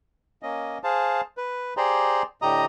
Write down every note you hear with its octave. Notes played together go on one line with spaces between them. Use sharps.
A#3 C#4 D#5
G#4 C5 F5 A5
B4
G4 G#4 C5 D5 A#5 C6
A2 D3 G4 D#5 A#5 D#6